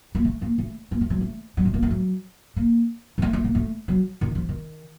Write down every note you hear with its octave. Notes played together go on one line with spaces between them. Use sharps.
A#3
A3
A#3
A3
A#3
A3
F#3
A3
F#3
A3
A#3
A3
F#3
A#3
A#3
A3
A3
A#3
A3
F#3
D#3
F3
D#3